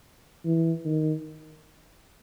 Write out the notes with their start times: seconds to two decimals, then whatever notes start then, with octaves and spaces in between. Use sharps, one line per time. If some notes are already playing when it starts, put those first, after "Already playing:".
0.45 E3
0.85 D#3